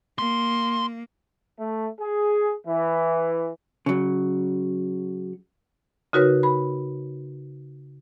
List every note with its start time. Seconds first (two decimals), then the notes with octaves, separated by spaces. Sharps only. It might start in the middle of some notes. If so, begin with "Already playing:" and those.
0.19 A#3 C6
1.60 A3
2.00 G#4
2.66 E3
3.86 C#3 F#3
6.13 C#3 D#4 F#4 A#4 B4 C#5
6.43 B5